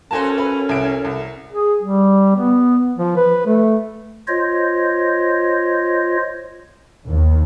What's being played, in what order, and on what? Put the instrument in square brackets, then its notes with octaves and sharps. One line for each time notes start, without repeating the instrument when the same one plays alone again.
[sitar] A#3 F#4 A4 [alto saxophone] C#4 [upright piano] C5 G#5 A5
[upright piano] B4
C2 D7
C2
[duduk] G#4
G3
B3
F3
B4
A3
[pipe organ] F4 C5 C#5 D#5
[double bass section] D#2